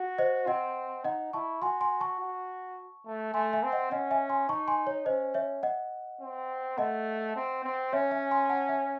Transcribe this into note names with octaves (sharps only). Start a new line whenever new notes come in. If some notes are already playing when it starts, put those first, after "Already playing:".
Already playing: F#4
C5 D#5
C4 D#5 F#5
D#4 D#5 F#5
E4 A5 C#6
F#4 G#5 C6
G#5 C6
A5 C#6
F#4
A3
A3 G#5 C6
E5 G#5
C4
D#5 F#5
C#4 D#5 F#5
E5 G#5
G#5 C6
D#4 A5 C#6
G#5 C6
C#5
C#4 C5 D#5
C#5 E5
D#5 F#5
C4
A3 D#5 F#5
C4
C4
C#4 C#5 E5
E5 G#5
G#5 C6
F#5 A5
E5 G#5